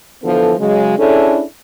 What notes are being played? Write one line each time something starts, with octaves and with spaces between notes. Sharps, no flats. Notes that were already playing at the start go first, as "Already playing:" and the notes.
D3 E3 F3 B3 A4
C#3 F#3 G#3
C#4 D4 E4 G#4 A4